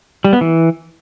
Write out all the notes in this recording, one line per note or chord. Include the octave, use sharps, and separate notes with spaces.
G3
B3
E3